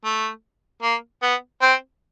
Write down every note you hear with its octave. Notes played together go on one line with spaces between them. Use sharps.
A3
A#3
B3
C4